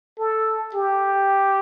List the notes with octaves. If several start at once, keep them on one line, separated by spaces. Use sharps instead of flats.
A4
G4